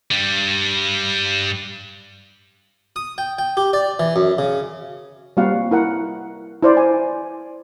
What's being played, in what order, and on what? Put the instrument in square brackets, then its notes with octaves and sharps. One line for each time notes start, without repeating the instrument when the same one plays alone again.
[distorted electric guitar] G2 G3
[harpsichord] D#6
G5
G5
G4
D5
E3
F#2
C#3
[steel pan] G3 A#3 C4 F#4 F5 F#5
E4 A#4 F#5
E4 C5 D5
G#5